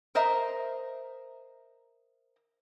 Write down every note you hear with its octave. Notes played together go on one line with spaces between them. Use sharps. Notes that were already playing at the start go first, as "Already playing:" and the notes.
A#4 C5 D#5 E5 A#5